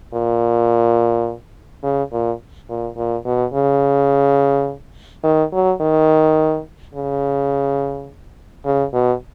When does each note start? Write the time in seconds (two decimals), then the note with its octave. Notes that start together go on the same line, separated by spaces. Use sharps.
0.14 A#2
1.83 C#3
2.12 A#2
2.69 A#2
2.97 A#2
3.25 B2
3.54 C#3
5.24 D#3
5.53 F#3
5.80 D#3
6.95 C#3
8.65 C#3
8.93 B2